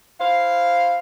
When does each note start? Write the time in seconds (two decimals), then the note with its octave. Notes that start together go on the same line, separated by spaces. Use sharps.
0.20 E4 C5 F5